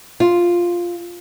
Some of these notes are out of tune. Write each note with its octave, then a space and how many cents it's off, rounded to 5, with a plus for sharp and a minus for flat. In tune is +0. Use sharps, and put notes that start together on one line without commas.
F4 +0